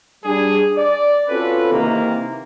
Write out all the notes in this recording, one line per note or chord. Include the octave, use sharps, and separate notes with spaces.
G3 D4 G#4
D5
C4 C#4 F4 F#4 A4 B4
C3 D#3 E3 A#3